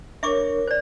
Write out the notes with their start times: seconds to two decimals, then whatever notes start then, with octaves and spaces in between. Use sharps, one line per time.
0.23 D4 A#4 C#5 E5 C#6 D6
0.67 C5 D5